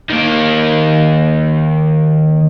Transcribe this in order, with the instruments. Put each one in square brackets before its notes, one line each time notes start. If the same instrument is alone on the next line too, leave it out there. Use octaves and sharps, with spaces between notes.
[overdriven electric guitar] D#3 A#3